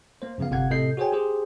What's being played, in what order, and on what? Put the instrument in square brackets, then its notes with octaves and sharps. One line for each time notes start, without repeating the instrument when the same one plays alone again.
[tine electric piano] A#3 C5
F#2 C#3 F3 B3 F5
G1 C3 F5 F#5 G#6
A2 C3 A4 D#5 G6 C7
F#4 G#4 C5 C#5 G5 G#5
G4 G#4 C5